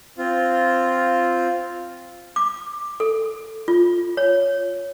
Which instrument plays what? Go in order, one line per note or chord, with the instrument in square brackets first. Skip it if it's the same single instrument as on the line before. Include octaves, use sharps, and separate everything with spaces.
[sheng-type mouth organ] C4 F4
[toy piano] D6
A4
F4
C#5